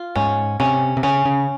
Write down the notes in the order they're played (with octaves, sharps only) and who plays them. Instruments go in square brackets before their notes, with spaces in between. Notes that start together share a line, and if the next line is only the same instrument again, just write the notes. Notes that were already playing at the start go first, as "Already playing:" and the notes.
Already playing: [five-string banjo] F4
[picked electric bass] G#2 [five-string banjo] C#4
[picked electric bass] C3 [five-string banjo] C#4
[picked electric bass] C3
[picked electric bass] C#3 [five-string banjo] C#4
[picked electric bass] C#3